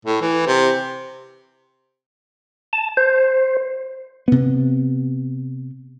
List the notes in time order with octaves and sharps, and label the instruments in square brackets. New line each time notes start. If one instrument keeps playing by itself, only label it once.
[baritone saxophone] A2
E3
C3
[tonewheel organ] A5
C5
[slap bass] C3 B3